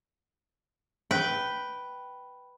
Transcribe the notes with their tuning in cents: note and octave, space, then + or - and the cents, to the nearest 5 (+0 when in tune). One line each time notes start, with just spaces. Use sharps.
B4 +0 G5 -10